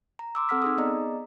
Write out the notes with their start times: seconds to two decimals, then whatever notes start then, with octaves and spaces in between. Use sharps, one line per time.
0.19 A#5
0.35 C6 D6 E6
0.49 C4 A4 F#5 E6 F6 B6
0.62 D#4 G#4 D#6
0.78 B3 G#4 D5 D#5 A#5